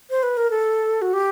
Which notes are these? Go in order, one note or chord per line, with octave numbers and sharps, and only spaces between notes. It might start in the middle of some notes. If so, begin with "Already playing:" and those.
C5
B4
A#4
A4
F#4
G4